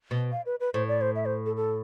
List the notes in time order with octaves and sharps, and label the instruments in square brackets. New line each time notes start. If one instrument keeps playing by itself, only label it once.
[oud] B2
[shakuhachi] F5
B4
B4
[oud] A2 [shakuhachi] C5
[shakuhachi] D5
C5
E5
C5
A4
A4